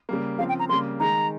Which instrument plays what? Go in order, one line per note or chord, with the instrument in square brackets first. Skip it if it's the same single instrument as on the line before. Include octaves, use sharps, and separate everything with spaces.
[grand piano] C#3 G3 A#3
[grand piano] C#3 F3 C4 [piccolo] F5
[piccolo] G5
A#5
[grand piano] C#3 G3 A#3 [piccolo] C6
[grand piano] D#3 G#3 D#4 [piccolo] A#5